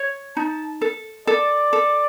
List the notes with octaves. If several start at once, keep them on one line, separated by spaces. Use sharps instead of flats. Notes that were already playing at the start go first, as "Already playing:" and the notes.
Already playing: C#5
D#4 A5
A4
A4 D5
A4